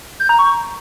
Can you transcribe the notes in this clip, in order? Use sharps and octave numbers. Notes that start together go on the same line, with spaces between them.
G6
A#5
C#6